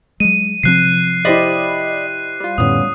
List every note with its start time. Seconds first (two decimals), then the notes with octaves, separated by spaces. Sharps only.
0.20 F#3 G#3 D#7
0.63 C3 F3 C4 F#6 C7
1.25 E4 G4 C5 D5 D#5 B5
2.40 G3 F4
2.58 F2 A2 D3 B3 C#4 D#6